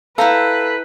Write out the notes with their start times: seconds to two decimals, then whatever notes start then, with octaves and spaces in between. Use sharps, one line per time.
0.18 E4 A4 B4 F5 G5 A#5